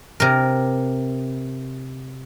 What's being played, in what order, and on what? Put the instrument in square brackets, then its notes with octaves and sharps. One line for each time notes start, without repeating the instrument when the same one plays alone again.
[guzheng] C3 A#4